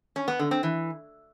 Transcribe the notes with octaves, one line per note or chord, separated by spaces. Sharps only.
C#4
B3
D3
C4
E3